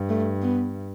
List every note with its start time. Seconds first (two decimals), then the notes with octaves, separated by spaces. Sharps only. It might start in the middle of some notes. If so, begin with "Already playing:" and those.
Already playing: G2
0.09 A3
0.42 B3